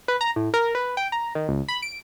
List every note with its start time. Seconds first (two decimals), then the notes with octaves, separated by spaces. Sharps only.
0.08 B4
0.21 A#5
0.36 A2
0.54 A#4
0.75 B4
0.97 G5
1.12 A#5
1.35 D#3
1.49 C#2
1.68 B5
1.82 D7